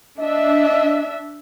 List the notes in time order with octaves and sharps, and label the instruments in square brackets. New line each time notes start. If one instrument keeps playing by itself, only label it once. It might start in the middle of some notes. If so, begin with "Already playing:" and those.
[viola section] D4 E5 [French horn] D#5